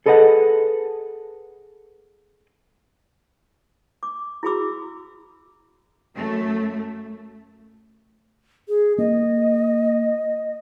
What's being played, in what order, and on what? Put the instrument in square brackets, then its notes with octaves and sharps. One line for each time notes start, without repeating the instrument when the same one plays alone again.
[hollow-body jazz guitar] G#4 A4 B4 D#5 E5 F#5
[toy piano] D6
E4 F#4 G#4 B5 D6 E6
[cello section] F#2 A3
[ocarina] G#4
[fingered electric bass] A#3 [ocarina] D#5